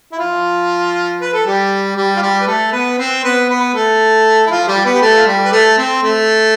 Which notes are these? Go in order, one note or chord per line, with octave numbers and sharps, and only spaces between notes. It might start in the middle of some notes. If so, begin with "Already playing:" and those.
E4
F3 F4
B4
A4
G3 G4
G3 G4
F4
G3 G4
B4
A3 A4
B3 B4
C4 C5
B3 B4
B3 B4
A3 A4
E4
F3 F4
G3 G4
B3 B4
G4
A3 A4
F4
G3 G4
B4
A3 A4
C4
A3